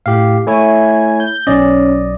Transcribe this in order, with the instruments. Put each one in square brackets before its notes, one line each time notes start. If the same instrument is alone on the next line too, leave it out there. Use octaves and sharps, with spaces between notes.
[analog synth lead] A2 [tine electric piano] G4 F5
[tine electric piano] A3 E4 C#5 [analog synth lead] G#5
[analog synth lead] G6
[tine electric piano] B1 D5 D#5 [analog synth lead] C#4